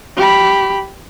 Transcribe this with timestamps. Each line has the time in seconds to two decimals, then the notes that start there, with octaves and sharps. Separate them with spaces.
0.17 G4 B5